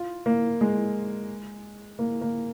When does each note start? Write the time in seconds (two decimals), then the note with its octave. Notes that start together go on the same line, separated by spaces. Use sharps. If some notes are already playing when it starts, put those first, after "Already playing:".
Already playing: F4
0.26 A#3
0.61 G#3
1.99 A#3
2.21 A#3